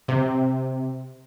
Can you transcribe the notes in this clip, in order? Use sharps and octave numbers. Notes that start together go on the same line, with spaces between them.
C3